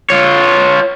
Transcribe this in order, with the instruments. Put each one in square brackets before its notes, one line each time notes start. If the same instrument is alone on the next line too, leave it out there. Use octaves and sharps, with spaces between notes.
[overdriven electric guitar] F4 C#5